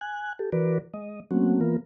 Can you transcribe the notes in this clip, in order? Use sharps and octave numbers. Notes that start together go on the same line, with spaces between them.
G#5 F#6
G4 A4
E3 F#4 A#4 B4 D5
G#3 D#5
F#3 A3 A#3 C4 C#4 F#4
E3 A#3 B3 F4 A#4